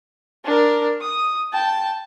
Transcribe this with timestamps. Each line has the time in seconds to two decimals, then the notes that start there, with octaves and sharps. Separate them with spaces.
0.45 D4 A#4
1.01 D#6
1.53 G5 A5